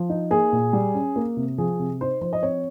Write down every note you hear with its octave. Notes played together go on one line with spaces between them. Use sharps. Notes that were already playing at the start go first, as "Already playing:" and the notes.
Already playing: F3
D#4
A#3 G#4
A#2
G3
C#4
A#3
C3
F3 G#4
C3
D#4 C5
F3 C5
D#5
C4 C#5